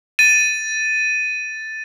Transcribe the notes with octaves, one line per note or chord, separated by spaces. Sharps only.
A6 D#7